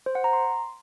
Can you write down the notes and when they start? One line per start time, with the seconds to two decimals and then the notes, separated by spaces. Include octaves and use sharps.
0.06 C5
0.15 F#5
0.24 A#5
0.33 C6